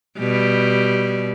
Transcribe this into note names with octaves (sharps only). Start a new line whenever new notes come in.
B2 G3